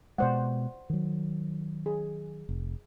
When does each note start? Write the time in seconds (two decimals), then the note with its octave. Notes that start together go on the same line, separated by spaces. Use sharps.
0.18 B2 G#3 C5 D5 F#5
0.90 D#3 F#3
1.86 G#4
2.49 F1